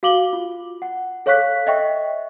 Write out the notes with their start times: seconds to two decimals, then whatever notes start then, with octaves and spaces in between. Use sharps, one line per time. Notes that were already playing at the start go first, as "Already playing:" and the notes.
0.03 F#4 F5 D6 F#7 G7
0.33 F4
0.82 F#5
1.26 A4 C#5 F5 C#6 F#6 B6
1.67 D#5 E5 G5 C#6